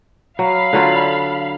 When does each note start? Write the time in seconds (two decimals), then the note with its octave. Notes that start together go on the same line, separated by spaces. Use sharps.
0.39 F#3 F5 B5
0.73 D3 F#3 F4